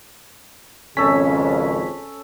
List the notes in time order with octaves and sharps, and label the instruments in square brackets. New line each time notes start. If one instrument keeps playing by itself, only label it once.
[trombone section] G#1 F2 [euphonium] C#3 [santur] C#4 A4 [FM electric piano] G#5 B6